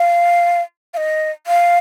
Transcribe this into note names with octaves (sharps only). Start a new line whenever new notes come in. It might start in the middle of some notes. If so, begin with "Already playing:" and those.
Already playing: F5
F5
D#5
F5